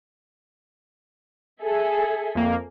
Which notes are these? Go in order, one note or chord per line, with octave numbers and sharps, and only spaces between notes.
G#4 A4 E5
F2 A#3